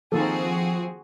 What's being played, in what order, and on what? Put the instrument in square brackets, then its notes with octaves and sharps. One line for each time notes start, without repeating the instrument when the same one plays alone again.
[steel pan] D#3 A#3 A4 [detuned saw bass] F3 [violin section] C4 F#4 G#4